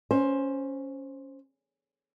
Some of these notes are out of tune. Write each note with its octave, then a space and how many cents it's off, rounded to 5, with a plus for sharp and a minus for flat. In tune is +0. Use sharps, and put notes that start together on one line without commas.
C#4 +0 C5 +10